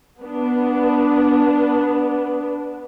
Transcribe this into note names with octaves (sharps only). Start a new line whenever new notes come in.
B3 D4